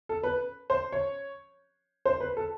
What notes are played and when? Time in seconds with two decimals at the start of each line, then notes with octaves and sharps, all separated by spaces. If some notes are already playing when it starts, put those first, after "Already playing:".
0.09 A4
0.23 B4
0.70 C5
0.92 C#5
2.05 C5
2.20 B4
2.37 A4